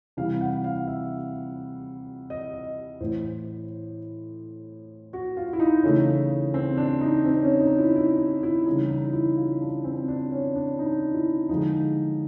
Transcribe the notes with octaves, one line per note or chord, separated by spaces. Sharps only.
C3 E3 G3 F5
F#5
F5
E5
D#5
D#5
A2 E3 A3 C5
F#4
F4
E4
D#4
C#3 E3 A3
C4
D4
D#4
C4
C#4
D#4
E4
E4
E4
C#3 E3 G3 D#4
D#4
E4
F4
D4
C4
D4
C#4
D4
D#4
E4
D3 F3 G#3 D#4